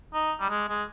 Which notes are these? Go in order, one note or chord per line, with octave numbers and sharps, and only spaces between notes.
D#4
G3
G#3
G#3